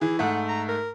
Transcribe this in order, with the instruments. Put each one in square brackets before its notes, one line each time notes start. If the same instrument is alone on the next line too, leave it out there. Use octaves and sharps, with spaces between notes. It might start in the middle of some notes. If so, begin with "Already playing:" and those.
[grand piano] E3 [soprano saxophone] G#4
[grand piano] G#2 A3 [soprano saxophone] F#5
[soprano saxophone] A#5
A#4